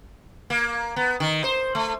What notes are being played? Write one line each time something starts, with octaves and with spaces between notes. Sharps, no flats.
A#3
B3
D#3
C5
A3